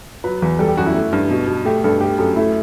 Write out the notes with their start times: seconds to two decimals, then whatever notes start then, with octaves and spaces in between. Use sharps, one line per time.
0.24 F#3 B4
0.42 E2 B4
0.59 G3 A4
0.68 G4
0.77 F#2 F#4
0.86 E4
0.94 A3
1.13 G2
1.31 B2
1.47 B2
1.65 A3 G4
1.84 G2 A4
2.01 A3 G4
2.18 F#2 A4
2.36 A3 E4